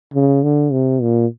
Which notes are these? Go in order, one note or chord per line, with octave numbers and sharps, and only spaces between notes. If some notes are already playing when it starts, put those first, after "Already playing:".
C#3
D3
C3
A#2